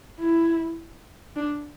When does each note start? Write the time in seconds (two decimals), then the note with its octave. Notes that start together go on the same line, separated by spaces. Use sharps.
0.19 E4
1.36 D4